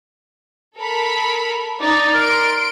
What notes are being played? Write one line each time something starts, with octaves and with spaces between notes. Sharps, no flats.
A4 A#4 B5
D#4 D5
A#4 C6 D7